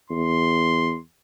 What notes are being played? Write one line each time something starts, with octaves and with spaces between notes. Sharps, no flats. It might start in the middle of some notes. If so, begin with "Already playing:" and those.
E2 C6